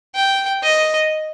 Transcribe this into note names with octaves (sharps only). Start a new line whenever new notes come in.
G5
D#5